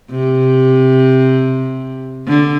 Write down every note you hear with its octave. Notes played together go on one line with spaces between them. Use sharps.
C3
D3